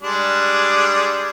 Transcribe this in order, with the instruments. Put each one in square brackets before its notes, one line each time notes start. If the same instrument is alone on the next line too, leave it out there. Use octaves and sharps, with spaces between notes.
[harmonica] G3 G#3 D4